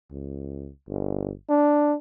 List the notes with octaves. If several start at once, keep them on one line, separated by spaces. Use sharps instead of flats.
C#2
G1
D4